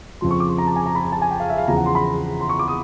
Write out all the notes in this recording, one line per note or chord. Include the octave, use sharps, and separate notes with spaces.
F2 C#3 F3 C6
C#6
D6
C6
A#5
A5
G#5
A#5
B5
A#5
A5
G#5
G5
F5
E5
F5
E2 C#3 F3 A#5
F#5
C6
B5
C6
C#6
D6
D#6